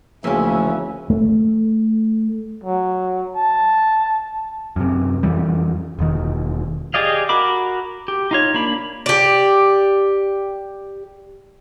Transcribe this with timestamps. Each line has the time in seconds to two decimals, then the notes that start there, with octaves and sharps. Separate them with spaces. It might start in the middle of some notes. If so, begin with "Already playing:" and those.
0.24 D2 C#3 E3 F3 A3 A#3 C#4 E5
1.10 A3
2.64 F#3
3.36 A5
4.76 F#2 C3
5.23 F2 E3 G3
5.99 E1 D#3
6.94 G4 G#4 D5 D#5 F5
7.29 F#4 A#4 B5 D6
8.08 G4
8.31 D#4 F4 C#5
8.54 A#3 D4 B5
9.06 G4 D5